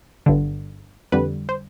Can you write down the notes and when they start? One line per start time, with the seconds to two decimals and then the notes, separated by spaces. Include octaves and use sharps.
0.26 G1 G2 D3
1.12 F2 D3 G3 B4
1.49 C5